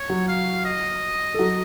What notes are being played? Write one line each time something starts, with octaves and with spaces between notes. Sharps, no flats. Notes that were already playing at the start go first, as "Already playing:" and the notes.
Already playing: C#5
F#3 F#4
F5
D#5
A4
F#3 F#4